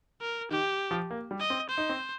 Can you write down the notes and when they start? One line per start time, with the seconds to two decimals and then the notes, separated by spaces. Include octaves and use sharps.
0.21 A#4
0.51 D#3 G4
0.91 F3
1.11 A#3
1.31 G3
1.40 D#5
1.50 C4
1.70 C5
1.78 D#4
1.89 C4